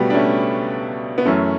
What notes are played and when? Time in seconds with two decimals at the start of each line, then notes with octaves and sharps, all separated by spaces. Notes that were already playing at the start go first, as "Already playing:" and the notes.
Already playing: C#2 B2 F#3 G3 A3 B3
0.10 D4
0.14 A3 C#4
1.18 B3
1.25 F#2 E3 A3 C#4